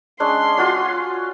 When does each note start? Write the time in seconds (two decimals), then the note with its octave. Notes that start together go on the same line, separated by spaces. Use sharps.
0.20 G#3 C#4 D4 C6
0.57 F4 F#4 C#5